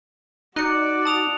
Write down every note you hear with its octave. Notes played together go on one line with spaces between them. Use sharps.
D#4 F#4 D5 F#6 C#7
A5 D#6 F7